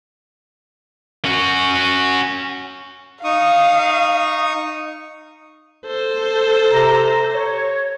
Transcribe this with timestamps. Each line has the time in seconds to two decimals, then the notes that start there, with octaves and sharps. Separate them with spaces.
1.25 C#4 F#4
3.24 D#4 F5 C#6 D#6
5.86 A4 C5
6.72 C3 A#5
7.34 C#5